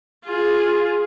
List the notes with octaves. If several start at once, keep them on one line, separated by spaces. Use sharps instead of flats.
F4 G#4